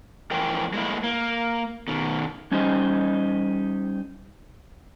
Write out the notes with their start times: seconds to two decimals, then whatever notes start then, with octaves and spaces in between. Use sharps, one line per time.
0.31 F2 E3 A#4 G5 G#5
0.73 G#3 A#3 E4
1.04 A#3
1.88 B2 D#3
2.51 G3 C#4 D#4 G4 C5 D#5